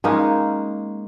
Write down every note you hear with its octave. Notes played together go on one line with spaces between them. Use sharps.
G#3 A#3 C#4 D#4